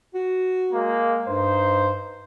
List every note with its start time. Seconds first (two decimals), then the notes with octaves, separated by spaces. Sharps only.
0.14 F#4
0.73 G#3 A#3
1.28 G2 D#4 C5